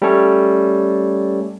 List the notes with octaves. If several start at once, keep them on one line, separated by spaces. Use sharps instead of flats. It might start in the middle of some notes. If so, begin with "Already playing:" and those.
G3 A3 C#4 A4 C#5